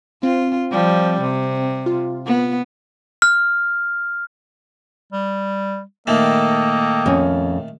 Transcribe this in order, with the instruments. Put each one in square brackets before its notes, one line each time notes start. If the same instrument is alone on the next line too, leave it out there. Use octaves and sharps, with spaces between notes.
[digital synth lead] C4 [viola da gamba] F4
[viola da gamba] F3 G3
C3
[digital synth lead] F4
[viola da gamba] B3
[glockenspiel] F6
[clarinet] G3
[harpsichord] A#2 D#3 A3 [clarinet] A#3 [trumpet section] A4 D#5 G5
[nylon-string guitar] F2 C#4